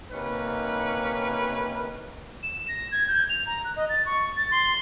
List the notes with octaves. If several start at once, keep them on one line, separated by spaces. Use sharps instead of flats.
C3 A#3 C#4 D#4 B4
E7
A#6
G#6
G6
F7
A#5
F#6
D#5
A6
C#6
A6
C6